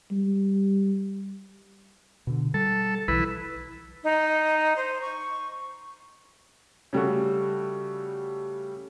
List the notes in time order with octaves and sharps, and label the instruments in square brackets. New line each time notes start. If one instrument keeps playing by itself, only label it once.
[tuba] G3
[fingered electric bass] B2 D3
[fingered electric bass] G3 [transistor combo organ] A4
[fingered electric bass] B1 D#3 E3 [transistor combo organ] E4 B4
[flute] D#4
C5
C#6
[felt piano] C#3 G3 A3 F#4